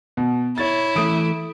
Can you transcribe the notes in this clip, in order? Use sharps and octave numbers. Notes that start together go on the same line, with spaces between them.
B2
E4 C#5 A6
E3 A3 D#6 D7